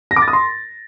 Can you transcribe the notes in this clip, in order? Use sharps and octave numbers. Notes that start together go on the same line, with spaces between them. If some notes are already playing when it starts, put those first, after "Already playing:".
A#6
D6
A6
D#6
C6